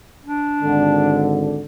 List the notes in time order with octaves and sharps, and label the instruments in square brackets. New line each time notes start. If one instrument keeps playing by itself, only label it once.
[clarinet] D4
[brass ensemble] G#1 D3